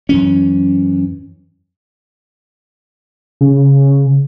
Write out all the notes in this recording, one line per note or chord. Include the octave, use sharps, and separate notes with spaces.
F#2 E3 C#4
C#3